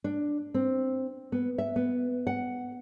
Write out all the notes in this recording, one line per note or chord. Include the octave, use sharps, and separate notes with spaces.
D4
C4
B3
E5
B3
F#5